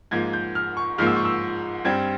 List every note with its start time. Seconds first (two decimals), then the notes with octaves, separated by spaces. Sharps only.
0.11 G#2 F3 A#3 G#6
0.33 G6
0.55 F6
0.77 C#6
0.98 G#2 F3 A#3 F6
1.07 E6
1.17 C#6
1.25 E6
1.85 G2 G3 C4 G#6